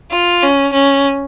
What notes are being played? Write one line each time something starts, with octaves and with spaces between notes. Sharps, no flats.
F4
C#4
C#4